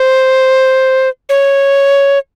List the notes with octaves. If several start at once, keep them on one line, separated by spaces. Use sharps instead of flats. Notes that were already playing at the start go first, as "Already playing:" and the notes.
Already playing: C5
C#5